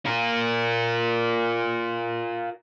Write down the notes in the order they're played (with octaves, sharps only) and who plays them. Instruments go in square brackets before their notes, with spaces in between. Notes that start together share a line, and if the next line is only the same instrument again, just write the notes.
[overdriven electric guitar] F4 A#4